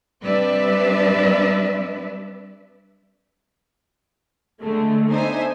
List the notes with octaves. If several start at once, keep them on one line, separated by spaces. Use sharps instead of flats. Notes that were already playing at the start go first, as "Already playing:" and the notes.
G3 C4 D4 B4 D5 E5
D3 G#3 A3
B3 D4 D#4 C5 E5 G#5